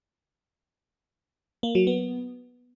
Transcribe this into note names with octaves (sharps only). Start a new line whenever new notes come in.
A#3
F#3
B3